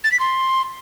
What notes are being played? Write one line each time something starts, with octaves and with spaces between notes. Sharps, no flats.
A6
B6
C6